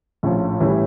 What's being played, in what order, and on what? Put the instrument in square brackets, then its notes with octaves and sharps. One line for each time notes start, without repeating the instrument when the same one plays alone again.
[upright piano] A#1 A2 F3 C#4 F4
A2 E3 G3 C#4 E4